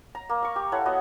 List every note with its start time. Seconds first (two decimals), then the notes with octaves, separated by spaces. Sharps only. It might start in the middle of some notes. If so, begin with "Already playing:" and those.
0.15 A#5
0.29 A#3
0.43 F5 C#6
0.56 G4
0.72 E4 A4 C#5 F#5
0.85 B3 F#4 D#5